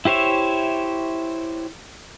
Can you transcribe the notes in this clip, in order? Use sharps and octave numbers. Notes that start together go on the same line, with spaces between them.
E4 G4 C5 C#5 E5